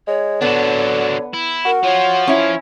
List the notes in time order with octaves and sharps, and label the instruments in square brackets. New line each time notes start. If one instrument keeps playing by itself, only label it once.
[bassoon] G#3 [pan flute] C#5
[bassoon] D3 [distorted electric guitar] F#3 D4 [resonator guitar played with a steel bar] B3
[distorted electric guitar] E4
[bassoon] F#4 [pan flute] A#4
[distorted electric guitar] F3 F4 [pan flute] C#5
[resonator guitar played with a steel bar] C#4 E4 [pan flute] C#5